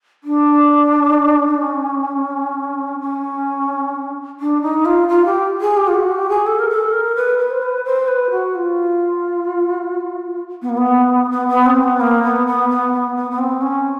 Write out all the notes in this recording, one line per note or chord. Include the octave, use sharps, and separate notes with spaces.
D4
C#4
C#4
D4
D#4
F4
F4
G4
G#4
G4
F4
F#4
G4
G#4
A4
A#4
A4
A#4
B4
B4
C5
B4
C5
B4
F#4
F4
B3
A#3
B3
B3
B3
C4
B3
A#3
B3
B3
B3
B3
B3
B3
C4
C#4